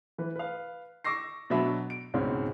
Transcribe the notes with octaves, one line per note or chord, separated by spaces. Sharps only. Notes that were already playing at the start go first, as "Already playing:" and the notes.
E3 B4
B4 F5
C#6 D6 E6 A#6 C7
B2 F#3 D4 E5 B5
D7
C#2 G#2 B2 C4 C#4